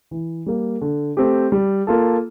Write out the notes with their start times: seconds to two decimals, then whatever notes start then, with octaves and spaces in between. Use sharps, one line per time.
0.11 E3
0.46 G3 A#3
0.81 D3
1.17 A3 C4 G4
1.52 G3
1.87 A#3 F4 A4